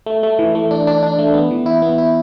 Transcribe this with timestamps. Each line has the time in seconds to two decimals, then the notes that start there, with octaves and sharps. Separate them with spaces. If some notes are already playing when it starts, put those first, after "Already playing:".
0.06 A3
0.23 A3
0.39 E3
0.55 A3
0.71 D4
0.87 D4
1.03 D4
1.19 A3
1.34 B3
1.51 E3
1.66 E4
1.82 B3
1.98 E4